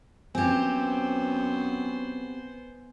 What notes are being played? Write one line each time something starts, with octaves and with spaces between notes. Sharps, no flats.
F#2 B3 C4 G4 C5 G#5 G#6